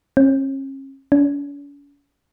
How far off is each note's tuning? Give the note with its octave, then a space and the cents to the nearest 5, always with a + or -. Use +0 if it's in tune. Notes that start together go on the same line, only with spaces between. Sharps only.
C#4 -40
C#4 +45